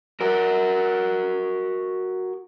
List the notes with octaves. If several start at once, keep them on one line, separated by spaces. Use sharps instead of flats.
F#4 A#4